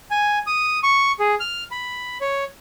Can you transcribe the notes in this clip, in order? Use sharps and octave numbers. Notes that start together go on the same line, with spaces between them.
G#5
D#6
C#6
G#4
F6
B5
C#5